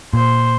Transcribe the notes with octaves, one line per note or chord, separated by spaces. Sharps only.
A#2 C5